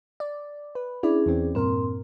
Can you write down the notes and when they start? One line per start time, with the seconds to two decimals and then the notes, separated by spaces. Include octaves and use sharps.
0.20 D5
0.75 B4
1.03 C#4 D4 E4 G#4 D5
1.26 E2 E3 C4
1.55 G2 A#2 C4 A#4 C6